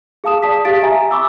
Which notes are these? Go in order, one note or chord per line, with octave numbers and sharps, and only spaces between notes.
G#4 F5 A5 D#6 E7
D5 A5 D#6 B6
G4 F5 A6 B6 D7
E5 G#5 A#5
B5 C#6 D6 E6